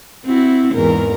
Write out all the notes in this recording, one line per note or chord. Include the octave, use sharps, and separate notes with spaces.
C4 E4 F#4
E2 G#2 A#4